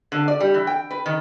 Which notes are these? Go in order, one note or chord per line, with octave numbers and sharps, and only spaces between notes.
D3
D5
G3
E3
G5
B4
D#3